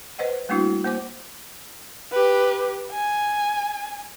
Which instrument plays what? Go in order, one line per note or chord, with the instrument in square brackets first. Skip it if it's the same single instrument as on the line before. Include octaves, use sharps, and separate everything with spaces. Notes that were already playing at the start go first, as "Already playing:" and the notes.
[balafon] B4 C5 D#5 F#5
G3 A3 A#3 D4 E4 F#4
A#3 C5 G#5 D6
[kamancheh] G4 B4
G#5